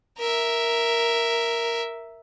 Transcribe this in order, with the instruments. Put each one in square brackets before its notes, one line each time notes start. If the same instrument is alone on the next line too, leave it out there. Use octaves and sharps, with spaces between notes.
[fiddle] A#4 E5